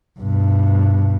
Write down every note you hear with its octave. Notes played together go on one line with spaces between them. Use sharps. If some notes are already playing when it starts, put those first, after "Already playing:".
G2 B2